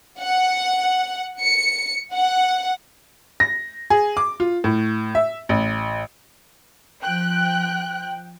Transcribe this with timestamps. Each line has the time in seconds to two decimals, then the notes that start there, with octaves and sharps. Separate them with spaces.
0.21 F#5
1.41 C#7
2.14 F#5
3.40 A#6
3.90 G#4
4.17 D6
4.40 F4
4.64 A2
5.15 E5
5.49 A1
7.02 F3 G5 F#6